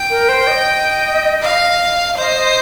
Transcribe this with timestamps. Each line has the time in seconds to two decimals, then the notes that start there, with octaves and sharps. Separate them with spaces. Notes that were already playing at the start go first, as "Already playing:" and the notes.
Already playing: G5
0.10 A#4
0.29 C5
0.47 D#5
1.43 F5
2.17 C5 D#5
2.36 D#5